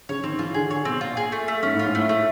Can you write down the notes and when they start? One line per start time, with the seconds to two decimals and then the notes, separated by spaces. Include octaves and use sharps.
0.09 C#3 C#5
0.24 D#3 C4
0.39 E3 F4
0.54 D3 G#4
0.70 D3 C#5
0.85 B2 C4
1.01 A#2 F4
1.17 G#4
1.32 A3
1.48 A3
1.63 G#2 C#4
1.74 A2
1.79 F4
1.85 G#2
1.95 A2 A3
2.09 A3